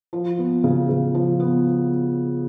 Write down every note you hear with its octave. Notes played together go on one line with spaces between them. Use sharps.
F3
B3
C#3
C#3
F3
B3